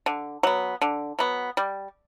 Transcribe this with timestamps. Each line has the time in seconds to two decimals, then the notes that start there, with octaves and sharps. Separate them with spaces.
0.06 D3
0.43 F#3 B3
0.81 D3
1.19 F#3 B3
1.57 G3